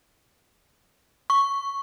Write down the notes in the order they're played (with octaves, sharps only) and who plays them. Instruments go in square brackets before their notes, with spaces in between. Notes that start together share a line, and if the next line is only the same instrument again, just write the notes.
[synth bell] C#6